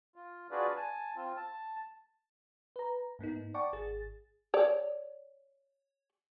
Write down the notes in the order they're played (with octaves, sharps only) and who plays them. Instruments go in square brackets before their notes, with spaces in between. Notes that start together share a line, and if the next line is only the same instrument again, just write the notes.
[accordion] F4
D4 F4 F#4 G#4 B4 D5
G#5 A5
C4 F4
A5
[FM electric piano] B4 A#5
G#2 A#3 B3 D#4
D5 F#5 G5 A5 C#6 D6
G#1 G#4 A6
[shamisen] C#5 D5